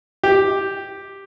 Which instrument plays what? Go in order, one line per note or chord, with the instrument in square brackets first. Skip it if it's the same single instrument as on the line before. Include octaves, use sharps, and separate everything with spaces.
[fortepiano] G4